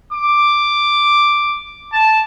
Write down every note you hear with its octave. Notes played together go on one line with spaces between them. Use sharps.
D6
A5